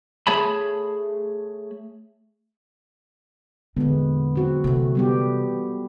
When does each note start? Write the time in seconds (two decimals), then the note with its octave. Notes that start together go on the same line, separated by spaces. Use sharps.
0.27 A3 G#4 C#5 A5 B5
3.77 E2 A#2 D3 G#3 B3
4.36 C4 F#4
4.64 C3 E3 A3
4.95 G3 B3 G4